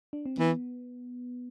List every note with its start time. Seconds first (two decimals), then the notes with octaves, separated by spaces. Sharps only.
0.13 D4
0.26 C4
0.38 E3 B3